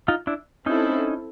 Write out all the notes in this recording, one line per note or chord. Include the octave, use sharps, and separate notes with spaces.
D#4 F4
D4 E4
C4 C#4 D#4 E4 A4